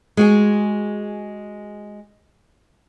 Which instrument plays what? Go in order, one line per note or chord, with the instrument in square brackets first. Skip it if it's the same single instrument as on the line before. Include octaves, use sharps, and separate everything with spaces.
[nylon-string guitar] G#3 F#4 G#4